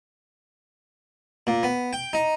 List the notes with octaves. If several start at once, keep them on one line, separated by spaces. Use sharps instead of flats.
A#2
B3
G5
D#4